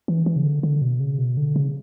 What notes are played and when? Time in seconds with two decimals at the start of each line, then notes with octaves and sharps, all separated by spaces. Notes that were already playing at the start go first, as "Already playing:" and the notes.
0.08 E3
0.26 E3
0.36 C#3
0.44 D3
0.63 D3
0.82 B2
1.00 C#3
1.18 B2
1.37 D3
1.56 C#3